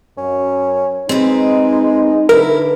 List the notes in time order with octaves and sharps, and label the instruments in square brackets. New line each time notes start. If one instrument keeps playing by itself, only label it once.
[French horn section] F#2 [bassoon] C#4
[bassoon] G#3 [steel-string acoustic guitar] C4 B4 [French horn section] D#4
[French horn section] D3 B4 [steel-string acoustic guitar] E4 [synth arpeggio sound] A#4